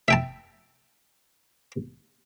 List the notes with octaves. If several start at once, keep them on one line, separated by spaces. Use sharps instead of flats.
E5 G5 A5